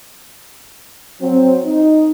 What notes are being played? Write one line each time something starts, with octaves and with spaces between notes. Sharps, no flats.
F#3 C4
D#4